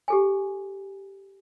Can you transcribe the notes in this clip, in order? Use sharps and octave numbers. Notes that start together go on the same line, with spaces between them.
G4 A4 G#5